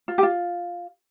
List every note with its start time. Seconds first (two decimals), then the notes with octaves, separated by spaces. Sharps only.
0.08 F4
0.18 G4
0.23 F4